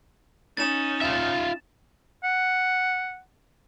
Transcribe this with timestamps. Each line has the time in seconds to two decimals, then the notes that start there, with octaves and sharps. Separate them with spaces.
0.57 C#4 D#4 A6 E7
1.02 F4 E5
2.24 F#5